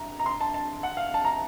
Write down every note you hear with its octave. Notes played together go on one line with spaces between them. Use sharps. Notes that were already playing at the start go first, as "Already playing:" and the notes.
Already playing: A#5
A#5
C6
A5
A5
F#5
F5
A5
A#5